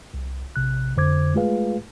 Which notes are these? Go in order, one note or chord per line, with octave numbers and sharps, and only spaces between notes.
C2
A#1 C3 F#6
F2 D3 C5 D6 G#6
G#3 A3 F4 G#4 B4 F5